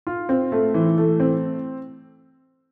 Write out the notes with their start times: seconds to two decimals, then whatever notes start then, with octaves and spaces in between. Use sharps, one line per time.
0.07 F4
0.29 C4
0.52 A3
0.74 E3
0.98 A3
1.20 C4